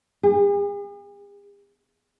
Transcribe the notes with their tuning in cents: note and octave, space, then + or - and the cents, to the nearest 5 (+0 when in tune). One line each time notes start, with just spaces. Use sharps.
G#4 -45